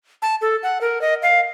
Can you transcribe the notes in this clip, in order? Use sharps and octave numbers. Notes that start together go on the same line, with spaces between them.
A5
A4
F#5
A#4
D#5
F5